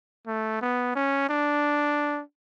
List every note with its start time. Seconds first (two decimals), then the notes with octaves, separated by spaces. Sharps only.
0.27 A3
0.62 B3
0.95 C#4
1.29 D4